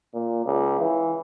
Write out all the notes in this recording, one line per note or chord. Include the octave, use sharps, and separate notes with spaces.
A#2
C#2
E3